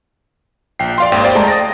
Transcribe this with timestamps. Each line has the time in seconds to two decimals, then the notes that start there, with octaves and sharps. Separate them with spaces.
0.79 A#1 G5 C7
0.98 D5 F5 C6
1.12 G#1 D#2 F5 G5
1.23 C5 D5 G5
1.35 G#3 A3 G5 A5 A#5
1.48 D#6 A6 A#6